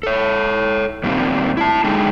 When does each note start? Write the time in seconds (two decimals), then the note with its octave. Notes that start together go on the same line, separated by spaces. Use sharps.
0.03 A4 C#5
1.04 A#2 D#3 G3 A#3 C4
1.57 E4 A5
1.84 D3 G#3 D#4 G#4 A4 G5